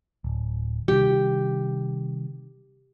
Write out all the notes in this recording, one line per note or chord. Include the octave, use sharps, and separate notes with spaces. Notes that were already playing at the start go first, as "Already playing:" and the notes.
D1
C3 D#3 G3 G4